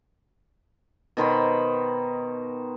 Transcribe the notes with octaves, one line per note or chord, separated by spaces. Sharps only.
B2 D#3 C5 B5